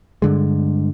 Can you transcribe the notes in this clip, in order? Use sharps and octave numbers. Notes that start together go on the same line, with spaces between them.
G2 D3 G#3